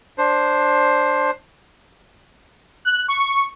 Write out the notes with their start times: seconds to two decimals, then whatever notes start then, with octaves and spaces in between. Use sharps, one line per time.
0.18 D4 C5
2.85 F#6
3.08 C#6